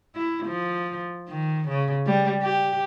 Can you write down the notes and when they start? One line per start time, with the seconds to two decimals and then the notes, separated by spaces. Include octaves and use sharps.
0.15 E4
0.46 F3
1.28 D#3
1.68 C#3
2.06 G3
2.42 G4